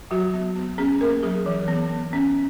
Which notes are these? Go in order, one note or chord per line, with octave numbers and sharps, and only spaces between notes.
F#3 F#4
B3
B3
C#4 G#4
A#3 A#4
F#3 G#4
E3
B3
B3
C#4